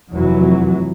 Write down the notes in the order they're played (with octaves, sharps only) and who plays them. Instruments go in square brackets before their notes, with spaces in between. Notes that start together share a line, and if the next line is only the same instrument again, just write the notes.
[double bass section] F1 E3 F#3